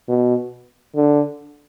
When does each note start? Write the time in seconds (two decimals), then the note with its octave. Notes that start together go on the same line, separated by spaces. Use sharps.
0.08 B2
0.95 D3